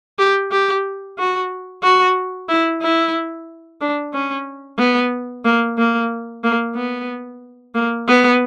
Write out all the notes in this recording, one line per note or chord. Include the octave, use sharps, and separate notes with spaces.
G4
G4
F#4
F#4
E4
E4
D4
C#4
B3
A#3
A#3
A#3
B3
A#3
B3